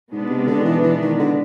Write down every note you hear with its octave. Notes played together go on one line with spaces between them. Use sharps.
G#2 B2 G#3 B3 D4
C3
D3
D#3
E3
E3
D#3
D3